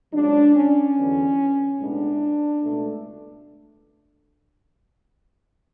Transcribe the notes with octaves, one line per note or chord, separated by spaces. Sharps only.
C#2 C#3 F#3 D4
C#4
E2 D3 F#3 B3
B1 A2 G#3 B3 D4
C#2 B2 A3